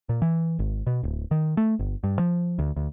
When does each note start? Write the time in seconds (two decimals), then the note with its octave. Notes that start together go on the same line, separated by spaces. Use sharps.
0.09 A#2
0.22 E3
0.59 G#1
0.87 B2
1.03 D1
1.31 D#3
1.57 A3
1.79 G1
2.04 G2
2.19 F3
2.59 D2
2.76 D2